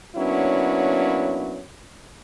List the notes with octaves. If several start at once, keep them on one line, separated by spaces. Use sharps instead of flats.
F#3 A#3 B3 C#4 D4 E4